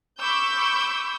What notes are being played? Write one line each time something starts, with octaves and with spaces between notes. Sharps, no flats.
B5 C#6 D6 E6 G6